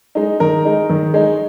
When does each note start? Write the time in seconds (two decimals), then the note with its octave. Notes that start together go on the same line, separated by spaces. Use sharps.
0.15 G#3 D#4
0.40 D#3 A#4
0.65 G#3 D#4
0.89 D#3
1.14 G#3 D#4